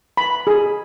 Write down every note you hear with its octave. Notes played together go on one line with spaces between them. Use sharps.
B5
G#4